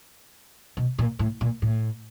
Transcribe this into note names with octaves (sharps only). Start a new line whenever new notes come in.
B2
A#2
A2
A#2
A2